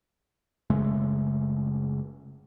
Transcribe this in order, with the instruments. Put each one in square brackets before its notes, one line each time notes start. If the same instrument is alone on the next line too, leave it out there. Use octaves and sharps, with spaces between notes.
[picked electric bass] F#1 C#3 G#3 A3